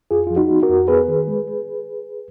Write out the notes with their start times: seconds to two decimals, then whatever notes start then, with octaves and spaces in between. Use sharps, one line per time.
0.11 F2 F4 G#4
0.27 F3 F4
0.36 D#4 F#4
0.50 B3
0.63 F#4 A#4
0.69 F2
0.88 B3 G#4 B4
1.08 D#3
1.28 G#3